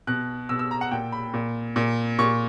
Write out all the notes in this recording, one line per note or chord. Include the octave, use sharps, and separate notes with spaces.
B2 F#6
B2 E6
E6
A#5
F#5
A#2 G5
B5
A#2
A#2
A#2 C#6